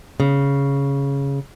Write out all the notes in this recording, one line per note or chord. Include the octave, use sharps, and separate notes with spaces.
C#3